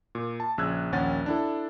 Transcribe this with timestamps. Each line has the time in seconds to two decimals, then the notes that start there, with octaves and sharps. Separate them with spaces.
0.15 A#2
0.40 A5
0.58 A#1 C#3 E6 F#6 G#6
0.92 A#1 D#2 C#4 F#5 A6
1.26 D4 E4 A4